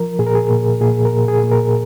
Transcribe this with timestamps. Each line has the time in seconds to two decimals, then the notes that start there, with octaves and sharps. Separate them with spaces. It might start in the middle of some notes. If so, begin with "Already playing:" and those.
Already playing: F3 A#4
0.19 A#2 G#4
0.27 A#4
0.35 G#4
0.50 A#2
0.81 A#2 G#4
1.05 A#4
1.12 A#2
1.28 G#4
1.43 A#2
1.52 A#4